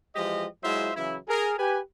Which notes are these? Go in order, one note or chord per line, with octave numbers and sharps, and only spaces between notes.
E3 F3 G#3 G4 D#5
F#3 G#3 E4 F4 C5 E5
C#3 E3 F#3 E4
G#4 A#4
G4 B4 G#5